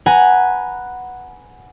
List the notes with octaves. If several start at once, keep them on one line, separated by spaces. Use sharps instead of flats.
B4 F#5 G#5 A#5